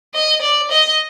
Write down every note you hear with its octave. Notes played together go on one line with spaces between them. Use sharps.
D#5
D5
D#5